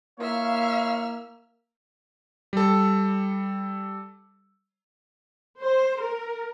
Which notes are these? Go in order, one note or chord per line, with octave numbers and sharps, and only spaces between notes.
A#3 E4 C#5 E5 F5 F6
G3 A4
C5
A#4